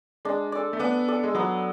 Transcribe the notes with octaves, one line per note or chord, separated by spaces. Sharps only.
G#3 D4
A4 D5
A3
B3 D4
A4 D5
G#3
F#3 B3